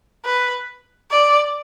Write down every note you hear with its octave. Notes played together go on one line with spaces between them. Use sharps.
B4
D5